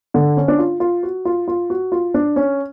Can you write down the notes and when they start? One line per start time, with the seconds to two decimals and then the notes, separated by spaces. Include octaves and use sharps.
0.14 D3
0.37 C#4
0.48 D4
0.59 F4
0.80 F4
1.03 F#4
1.25 F4
1.48 F4
1.70 F#4
1.92 F4
2.14 D4
2.36 C#4